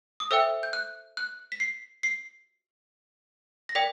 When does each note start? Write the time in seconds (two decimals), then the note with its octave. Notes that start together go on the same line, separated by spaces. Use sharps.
0.20 D#6
0.31 A4 C5 E5 G5 E6
0.63 G6
0.73 F#6
1.17 F#6
1.52 B6
1.60 C7
2.03 C7
3.69 A#6
3.75 A#4 D5 G5 B6